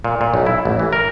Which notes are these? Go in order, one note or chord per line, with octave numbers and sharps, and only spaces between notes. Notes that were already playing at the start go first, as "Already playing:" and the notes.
A#2
A#2
B1
E4
A1
E3
A#4